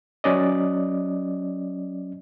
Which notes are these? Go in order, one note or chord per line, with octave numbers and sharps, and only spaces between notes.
F#3 C#4 D5 D#5